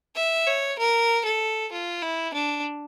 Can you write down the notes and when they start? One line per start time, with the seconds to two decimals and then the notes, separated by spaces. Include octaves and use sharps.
0.16 E5
0.47 C#5
0.79 A#4
1.25 A4
1.72 F4
2.03 E4
2.34 D4